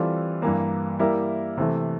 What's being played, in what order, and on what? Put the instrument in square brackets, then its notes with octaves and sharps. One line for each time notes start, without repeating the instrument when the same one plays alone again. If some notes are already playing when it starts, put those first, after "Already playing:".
Already playing: [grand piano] E3 G3 C4 F4 A4
G2 E3 A#3
G3 A#3 E4 A#4 E5
C3 E3 A3